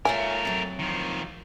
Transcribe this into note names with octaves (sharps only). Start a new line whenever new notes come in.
A3 F4 A#4 C#5 E5 G#5
F2 F#3
D#3 F3